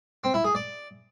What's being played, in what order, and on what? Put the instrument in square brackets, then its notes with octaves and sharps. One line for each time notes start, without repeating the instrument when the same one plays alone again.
[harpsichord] C4
E4
G#4
D5